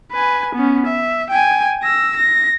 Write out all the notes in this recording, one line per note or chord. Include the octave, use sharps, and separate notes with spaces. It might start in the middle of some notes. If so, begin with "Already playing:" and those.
B4 G#5
B3 C#4
E5
G5 G#5
E6 A#6
A#6